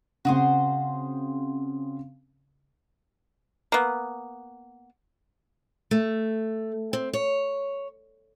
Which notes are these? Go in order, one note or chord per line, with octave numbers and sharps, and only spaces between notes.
C#3 C4 F#4 G#4 C5
A#3 B3
A3
C4
C#5